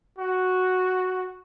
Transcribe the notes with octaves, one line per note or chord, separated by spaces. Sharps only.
F#4